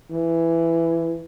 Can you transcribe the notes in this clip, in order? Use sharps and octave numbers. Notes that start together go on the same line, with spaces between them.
E3